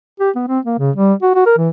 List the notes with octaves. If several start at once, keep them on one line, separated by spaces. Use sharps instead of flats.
G4
B3
C4
A#3
C#3
G3
F#4
F#4
A#4
E3